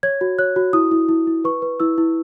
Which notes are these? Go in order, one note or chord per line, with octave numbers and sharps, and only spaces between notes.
C#5 G#6
F#4
C#5 F#6
F#4
E4 D#6
E4
E4
E4
B4 C#6
B4
E4 E6
E4